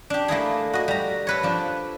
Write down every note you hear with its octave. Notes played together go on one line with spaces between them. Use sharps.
D4 G4
A3 A#3 E4 G#4
F#4 D#5
G3 A#5
A4 B4 C#5
F3 D4